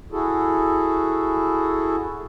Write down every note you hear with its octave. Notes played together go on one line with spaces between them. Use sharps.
E4 F#4 G#4 A4